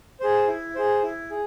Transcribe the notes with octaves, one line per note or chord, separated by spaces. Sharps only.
G#4 C5
E4
G#4 C5
E4
G#4